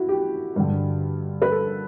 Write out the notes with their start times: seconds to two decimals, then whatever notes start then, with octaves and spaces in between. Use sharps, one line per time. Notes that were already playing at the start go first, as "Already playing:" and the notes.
Already playing: E4 F#4
0.09 G4
0.56 G2 D3
1.42 B4
1.51 A4